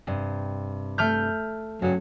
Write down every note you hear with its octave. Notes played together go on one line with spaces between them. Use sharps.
G2 C3
A3 F6 G6
G2 C#3 F#3